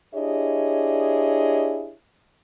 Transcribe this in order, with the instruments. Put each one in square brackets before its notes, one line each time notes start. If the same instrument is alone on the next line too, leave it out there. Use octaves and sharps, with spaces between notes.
[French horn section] D4 E4 G4 G#4 C#5 D#5